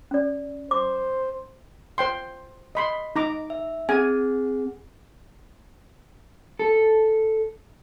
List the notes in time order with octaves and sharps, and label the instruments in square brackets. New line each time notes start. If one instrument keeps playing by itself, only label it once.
[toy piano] C#4 D5
[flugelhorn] C5 [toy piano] D6
[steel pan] C5 G5 C6
D#5 B5 C6
D#4 A#5 D6
[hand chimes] E5
[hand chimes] C4 G#4 F#5 [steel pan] G#5
[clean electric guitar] A4